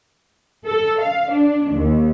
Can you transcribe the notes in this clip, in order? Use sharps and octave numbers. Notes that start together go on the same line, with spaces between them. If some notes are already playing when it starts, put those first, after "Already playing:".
A4
F5
D4
D#2